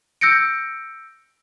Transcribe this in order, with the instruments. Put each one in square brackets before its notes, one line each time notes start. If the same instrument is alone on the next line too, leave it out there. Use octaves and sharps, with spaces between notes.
[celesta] E6 G6 A#6 C#7 D7